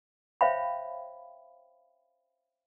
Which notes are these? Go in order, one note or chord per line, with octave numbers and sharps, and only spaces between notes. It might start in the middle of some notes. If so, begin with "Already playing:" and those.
C5 C#5 E5 F5 G5 B5